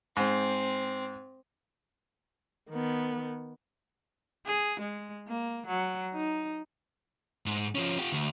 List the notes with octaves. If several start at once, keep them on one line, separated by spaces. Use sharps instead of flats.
G#2 C4
D#3 B3
G#4
G#3
A#3
F#3
D#4
G#2
F3 C#4
F4 G4
D2